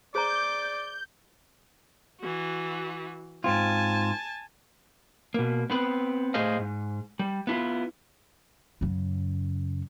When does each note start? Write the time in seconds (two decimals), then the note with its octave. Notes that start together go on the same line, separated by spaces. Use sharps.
0.15 G#4 C5 D5 A#5 D6 G6
2.20 E3 F#4
3.44 G#2 C4 F4 G#5 A5
5.34 B2 A#3
5.70 B3 C4 B4
6.34 A2 A3 G#4 C5 D#5 F5
6.59 G#2
7.19 G3
7.47 B3 E4 F4
8.81 F#2 C#3